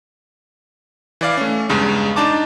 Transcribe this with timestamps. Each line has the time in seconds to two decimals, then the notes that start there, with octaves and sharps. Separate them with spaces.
1.21 E3 D5 F5
1.37 A3 C#4
1.69 E2 G2 C#3 G#3
2.16 D4 D#4 A5 D6